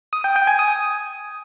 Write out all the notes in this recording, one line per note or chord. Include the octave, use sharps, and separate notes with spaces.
D#6
G5
G5
G#5
D#6